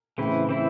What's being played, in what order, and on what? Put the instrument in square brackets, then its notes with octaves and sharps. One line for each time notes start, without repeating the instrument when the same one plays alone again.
[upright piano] A2 C#3 [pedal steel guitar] E3 C4 E4
[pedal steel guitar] E3 C4 E4